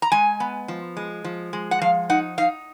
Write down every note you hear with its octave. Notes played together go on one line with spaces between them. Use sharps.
A#5
G#3 G#5
B3
F3
G#3
F3
G#3
F#5
F3 F5
D#4 F#5
D#4 F5